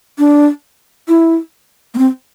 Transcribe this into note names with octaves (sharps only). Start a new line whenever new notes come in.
D4
E4
A#3
C4